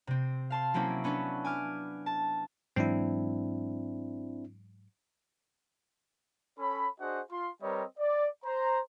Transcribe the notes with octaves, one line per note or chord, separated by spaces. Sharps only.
C3 C4
F5 A5 C6
F#3 A#3 C4 C#4 E4 D6
B3 C#4 D4 B4
G#5 D6 F6
A5
G#2 E3 F#3 C4 D4 E4
C#4 A4 C#5 B5
D4 F#4 G#4 C5 D#5 F#5
F4 C6
G3 C4 A#4 B4 C#5 D#5
D5
C5 A#5